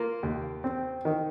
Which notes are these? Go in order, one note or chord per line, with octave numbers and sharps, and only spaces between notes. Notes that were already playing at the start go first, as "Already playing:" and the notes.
Already playing: A#3 F4
D#2
C4
D#3